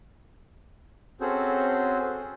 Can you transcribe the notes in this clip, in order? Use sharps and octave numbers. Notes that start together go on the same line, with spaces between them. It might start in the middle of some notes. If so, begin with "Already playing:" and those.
C4 C#4 F#4 G#4 A4 C5